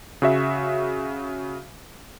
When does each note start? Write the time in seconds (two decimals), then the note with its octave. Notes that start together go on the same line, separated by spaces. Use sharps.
0.22 C#3 F#4 E5